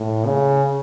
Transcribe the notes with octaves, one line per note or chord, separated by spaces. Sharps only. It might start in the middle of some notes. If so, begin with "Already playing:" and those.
Already playing: A2
C#3